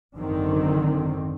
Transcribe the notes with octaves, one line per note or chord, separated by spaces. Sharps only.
G#1 F#2 D3 D#3 C4